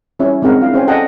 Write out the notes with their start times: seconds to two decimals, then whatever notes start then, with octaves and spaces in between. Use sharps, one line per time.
0.19 G3 C#4 E4 C#5 E5
0.42 G#3 C4 D#4 A#4 F#5
0.61 D4 E4 F5
0.74 C#4 C5 G5 G#5
0.88 A4 D5 D#5 F#5 G5 A5